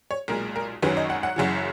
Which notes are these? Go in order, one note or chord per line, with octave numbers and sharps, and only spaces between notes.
C#5
B1 A#2 G#3 A#4
A#4
G#1 F#2 D#3 F#3 C#4 B4
D#5
F#5
F#5
F#1 F#2 C#3 E3